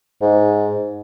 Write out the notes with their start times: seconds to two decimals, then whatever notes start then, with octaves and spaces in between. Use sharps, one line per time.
0.22 G#2